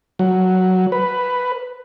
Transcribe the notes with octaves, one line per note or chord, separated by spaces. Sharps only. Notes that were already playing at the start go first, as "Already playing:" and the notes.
F#3
B4